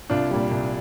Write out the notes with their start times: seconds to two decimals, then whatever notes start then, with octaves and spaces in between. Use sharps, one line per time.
0.10 C2 D4 F4
0.31 A#2 G3
0.52 C2